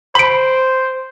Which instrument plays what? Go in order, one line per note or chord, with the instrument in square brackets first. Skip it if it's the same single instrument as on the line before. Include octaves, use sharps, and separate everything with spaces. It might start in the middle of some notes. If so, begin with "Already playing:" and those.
[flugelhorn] C5 [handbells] B5 D7